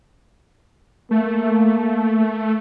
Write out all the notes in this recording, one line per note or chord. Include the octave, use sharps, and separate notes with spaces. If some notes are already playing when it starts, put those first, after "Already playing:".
A3 A#3